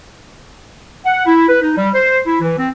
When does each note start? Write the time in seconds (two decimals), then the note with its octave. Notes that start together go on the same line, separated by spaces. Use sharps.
1.05 F#5
1.26 E4
1.49 B4
1.62 D#4
1.77 G3
1.94 C5
2.27 E4
2.41 E3
2.58 C4